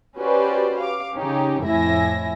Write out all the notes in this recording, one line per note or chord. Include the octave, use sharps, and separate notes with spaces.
C#4 F#4 G4 B4 C5 D5
F5 D6
C#3 C#4 D#4 G4
F2 A2 E4 E5 G#5 A#6